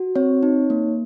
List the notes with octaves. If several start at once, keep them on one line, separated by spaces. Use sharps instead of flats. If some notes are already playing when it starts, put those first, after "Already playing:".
Already playing: F#4
C4 C#5
D#4
A#3